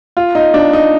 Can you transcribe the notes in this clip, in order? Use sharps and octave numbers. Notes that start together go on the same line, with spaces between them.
F4
D#4
D4
D#4